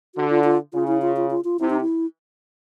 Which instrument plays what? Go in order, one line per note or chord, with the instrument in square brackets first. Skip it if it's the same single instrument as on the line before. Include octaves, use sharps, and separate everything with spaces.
[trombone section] D3 [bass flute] F#4
[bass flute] F4
F4
[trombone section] C#3 [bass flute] F4
[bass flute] E4
F4
F4
F4
F4
[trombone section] C3 [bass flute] E4
[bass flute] D#4
E4